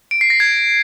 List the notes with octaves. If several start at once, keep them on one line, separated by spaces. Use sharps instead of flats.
D7
C7
A#6
G#6